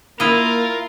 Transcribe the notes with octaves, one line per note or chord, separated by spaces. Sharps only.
A#3 E4 F4 A#4 D#5